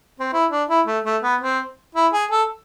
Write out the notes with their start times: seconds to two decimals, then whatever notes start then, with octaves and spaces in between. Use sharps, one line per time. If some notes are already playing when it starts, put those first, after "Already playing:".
0.20 C4
0.33 E4
0.51 D4
0.69 E4
0.87 A3
1.05 A3
1.23 B3
1.41 C4
1.95 E4
2.13 G#4
2.31 A4